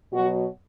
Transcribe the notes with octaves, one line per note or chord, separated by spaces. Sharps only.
B2 F#3 F#4